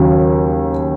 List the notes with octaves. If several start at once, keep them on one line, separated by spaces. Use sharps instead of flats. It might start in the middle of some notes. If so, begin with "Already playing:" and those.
Already playing: D#2 C#3 F#3